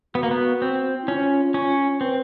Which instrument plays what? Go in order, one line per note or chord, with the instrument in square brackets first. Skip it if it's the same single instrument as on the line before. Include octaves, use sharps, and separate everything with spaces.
[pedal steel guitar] B3 [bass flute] F#4
[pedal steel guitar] A#3
B3
C4
[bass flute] E4
[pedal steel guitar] C#4 [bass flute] F4
[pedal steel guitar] C#4
[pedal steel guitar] C4 [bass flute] B4